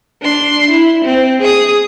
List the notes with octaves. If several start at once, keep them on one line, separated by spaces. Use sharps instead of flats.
D4 C6
E4
C4
G#4 D#6